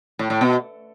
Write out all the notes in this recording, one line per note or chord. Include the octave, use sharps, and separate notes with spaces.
A2
A2
B2